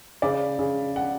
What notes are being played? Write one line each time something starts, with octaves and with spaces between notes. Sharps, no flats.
C#3 D5
C#3
F#5